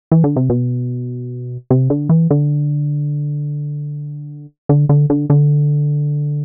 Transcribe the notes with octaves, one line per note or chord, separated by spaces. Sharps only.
E3
D3
C3
B2
C3
D3
E3
D3
D3
D3
D3
D3